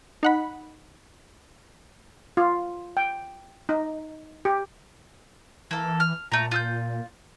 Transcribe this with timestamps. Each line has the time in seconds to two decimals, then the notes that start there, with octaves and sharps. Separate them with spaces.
0.23 D#4 F#5 B5
2.37 F4
2.97 G5
3.69 D#4
4.45 G4
5.71 E3 A#3 A4
6.00 F6
6.32 A#2 A3 A#5
6.51 F4 E6 G6